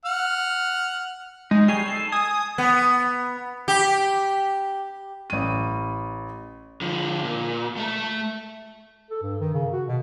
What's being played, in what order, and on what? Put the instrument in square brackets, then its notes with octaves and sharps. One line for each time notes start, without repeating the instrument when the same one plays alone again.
[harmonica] F#5 F6
[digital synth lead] G#3 [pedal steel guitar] D#4
[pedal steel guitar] G3 G#4 C#5 [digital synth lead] C7
[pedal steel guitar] A4
[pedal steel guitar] G#5 [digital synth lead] D#6
[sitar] B3
G4
[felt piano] A1 D#7
[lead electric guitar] D3 F3
A#2
A3 E5
[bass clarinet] A4
G2
D#3
C#3
F#4
B2